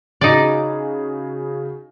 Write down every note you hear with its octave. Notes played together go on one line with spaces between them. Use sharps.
C#3 D#4 F#4 G#4 D5